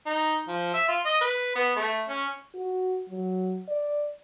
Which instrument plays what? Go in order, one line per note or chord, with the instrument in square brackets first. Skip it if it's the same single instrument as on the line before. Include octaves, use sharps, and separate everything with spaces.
[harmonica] D#4
F3
E5
F4
D#5
B4
B3
A3
C#4
[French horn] F#4
F#3
D5